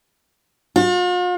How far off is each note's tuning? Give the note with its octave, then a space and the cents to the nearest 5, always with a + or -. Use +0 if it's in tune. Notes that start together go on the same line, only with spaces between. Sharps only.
F4 +45